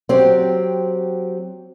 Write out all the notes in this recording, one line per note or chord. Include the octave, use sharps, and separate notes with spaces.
F#3 C4 G4